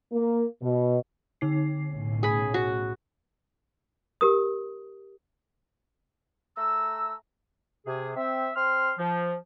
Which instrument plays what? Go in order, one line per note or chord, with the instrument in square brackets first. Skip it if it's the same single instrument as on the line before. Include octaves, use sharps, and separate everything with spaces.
[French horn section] A#3
B2
[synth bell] D3 D#4 C7
[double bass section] B1 A2 C#4
[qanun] G#4 B5
F#4
[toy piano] G4 A#4 D#6
[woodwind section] A3 A#5 E6
C3 G#4
C4 E5
C4 C6 F6
F3